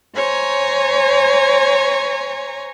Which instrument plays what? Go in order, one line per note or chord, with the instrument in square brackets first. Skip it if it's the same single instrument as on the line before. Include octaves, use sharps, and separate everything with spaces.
[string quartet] C5 C#5 G#5 A#5